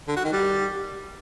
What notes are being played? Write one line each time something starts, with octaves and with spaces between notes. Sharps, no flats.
D3
F#4
D#3
G3